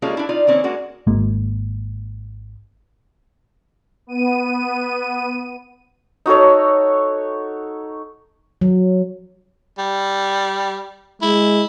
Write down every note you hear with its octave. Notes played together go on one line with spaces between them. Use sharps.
G3 G#3 A#3 C#4 F4 A4
D4 E4
D#4 F4 D5
D#3 A#3 C4 C#4
G#3 A#3 D4 F#4
G#1 G#3 A#3
B3 D#7
D#4 F#4 A4 C#5
F#3
G3
G#3 E4